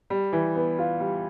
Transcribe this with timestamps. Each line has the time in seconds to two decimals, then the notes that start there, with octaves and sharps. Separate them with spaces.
0.10 G3
0.33 E3
0.55 B3
0.79 F4
1.00 G3